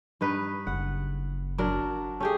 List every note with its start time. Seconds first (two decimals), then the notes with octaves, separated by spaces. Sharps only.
0.21 G2 D#4 B4
0.67 F#1 F#5
1.58 F#3 D4 A#4
2.20 A3 C#4 G4 G#4